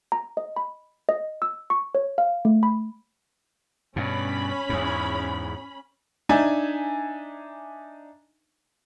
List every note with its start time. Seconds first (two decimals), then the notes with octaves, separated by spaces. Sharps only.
0.12 A#5
0.37 D#5
0.56 B5
1.09 D#5
1.42 E6
1.70 C#6
1.95 C#5
2.18 F5
2.45 A3
2.63 B5
3.96 G2 B2 C#4 B5
4.69 E2 G#2
6.29 D4 D#4 E5 G#5